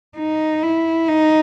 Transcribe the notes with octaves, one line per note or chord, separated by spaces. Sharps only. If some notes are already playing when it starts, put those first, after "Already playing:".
D#4
E4
D#4